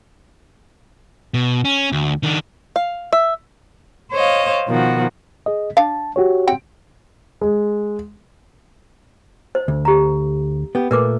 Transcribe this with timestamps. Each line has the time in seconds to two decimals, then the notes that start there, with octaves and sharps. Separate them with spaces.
1.34 B2
1.65 C#4
1.92 D2
2.23 D#3 D4
2.76 F5
3.13 E5
4.12 C5 C#5 D#5 F5
4.68 B2 D#3 F3 F#4
5.46 G#4 D#5
5.77 D4 F5 A5
6.16 F#4 G4 C#5
6.47 C4 F#5 G5
7.41 G#3
9.55 C5
9.68 D2
9.85 G4 A#5
10.75 B3 G4
10.91 A#2 A3 A#4 B4 D6